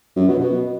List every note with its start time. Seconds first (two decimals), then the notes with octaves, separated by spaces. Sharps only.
0.16 F#2
0.28 B2
0.40 B2